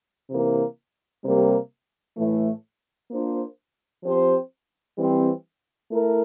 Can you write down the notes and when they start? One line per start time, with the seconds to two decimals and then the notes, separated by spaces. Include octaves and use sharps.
0.29 C3 E3 A#3
1.23 C3 G3 A#3
2.17 A2 E3 A3
3.10 A#3 D4 F4 C5
4.04 F3 C4 G4 C5
4.97 E3 G3 C4
5.91 A3 E4 A#4